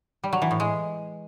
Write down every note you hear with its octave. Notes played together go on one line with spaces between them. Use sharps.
G3
F#3
E3
A2
G#3